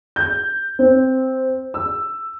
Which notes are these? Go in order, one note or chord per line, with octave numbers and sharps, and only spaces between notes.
G6
C4
E6